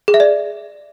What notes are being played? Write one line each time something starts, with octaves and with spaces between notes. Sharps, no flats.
G#4
E5
D5